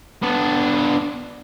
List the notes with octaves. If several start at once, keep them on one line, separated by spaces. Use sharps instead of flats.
B3 D4